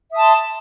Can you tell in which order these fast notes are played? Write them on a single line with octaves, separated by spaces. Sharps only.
E5 D#6 A5 C6